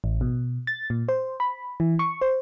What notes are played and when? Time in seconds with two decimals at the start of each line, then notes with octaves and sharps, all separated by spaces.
0.04 A1
0.21 B2
0.67 A6
0.90 A#2
1.09 C5
1.40 B5
1.80 E3
1.99 C#6
2.21 C5